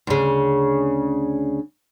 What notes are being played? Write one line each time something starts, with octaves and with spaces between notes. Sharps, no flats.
D2 C#3